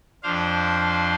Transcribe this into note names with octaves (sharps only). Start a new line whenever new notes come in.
F2 F3 D4 C5 F5